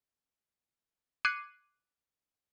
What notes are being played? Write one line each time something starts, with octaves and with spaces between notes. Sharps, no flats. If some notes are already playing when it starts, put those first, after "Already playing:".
D6 F#6 G#6 C7 C#7 D#7